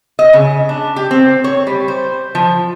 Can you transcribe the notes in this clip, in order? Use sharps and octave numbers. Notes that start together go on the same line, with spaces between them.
D#5
C#3
D4
G4
C4
C#5
G3
C5
F3